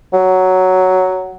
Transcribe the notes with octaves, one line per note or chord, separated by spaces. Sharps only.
F#3